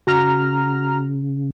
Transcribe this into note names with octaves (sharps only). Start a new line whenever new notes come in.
C#3 F#4 A#5 F6